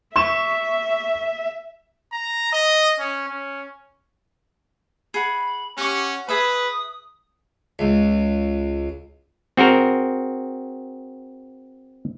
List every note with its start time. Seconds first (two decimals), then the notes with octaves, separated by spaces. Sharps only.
0.16 E5 C#6 E7
2.12 A#5
2.52 D#5
2.99 C#4
3.28 C#4
5.14 G#4 F#5 B5
5.77 C#4 G4 F#5 C#6
6.29 G#4 B4 E5 B5 D#6
7.79 C#2
9.57 C4 F#4 G#4 A#4